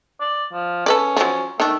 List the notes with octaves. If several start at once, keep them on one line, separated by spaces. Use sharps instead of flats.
D5
F3
C#4 A4 B4 D5
F3 F#3
D#3 A3 D4